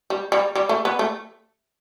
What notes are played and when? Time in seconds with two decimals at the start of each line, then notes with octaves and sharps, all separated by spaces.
0.10 G3
0.32 G3
0.56 G3
0.69 A3
0.85 B3
0.99 A3